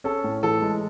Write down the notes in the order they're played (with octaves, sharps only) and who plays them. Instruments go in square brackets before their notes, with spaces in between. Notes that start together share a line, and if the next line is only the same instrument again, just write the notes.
[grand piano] C#4 [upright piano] A4
[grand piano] A2
[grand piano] E3 [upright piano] A4
[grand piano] G#3